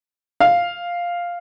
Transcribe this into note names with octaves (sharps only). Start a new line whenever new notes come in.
F5